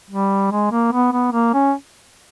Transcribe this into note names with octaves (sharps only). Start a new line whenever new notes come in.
G3
G#3
A#3
B3
B3
A#3
C#4